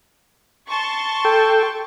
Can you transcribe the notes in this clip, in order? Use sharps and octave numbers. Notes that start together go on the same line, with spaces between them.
A5 C6 C#6
A4 G5